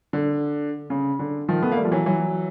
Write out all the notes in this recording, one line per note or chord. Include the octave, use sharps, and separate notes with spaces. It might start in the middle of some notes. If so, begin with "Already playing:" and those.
D3
C#3
D3
D#3 F3
A3 B3
A#3
G3 A3
F3
E3 F#3
E3 F#3